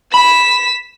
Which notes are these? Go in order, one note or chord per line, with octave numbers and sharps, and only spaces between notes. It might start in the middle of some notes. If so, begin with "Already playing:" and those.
B5 B6 E7